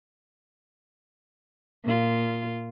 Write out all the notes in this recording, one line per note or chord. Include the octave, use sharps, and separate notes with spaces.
A#2 F4